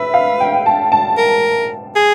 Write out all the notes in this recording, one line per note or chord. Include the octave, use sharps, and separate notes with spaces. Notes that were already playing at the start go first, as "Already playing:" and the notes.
Already playing: B4 E5
F5
G5
A5
A5
A#4
G#4